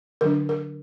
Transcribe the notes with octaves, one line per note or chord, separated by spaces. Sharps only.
D3 F#3 D4 A#4
A#4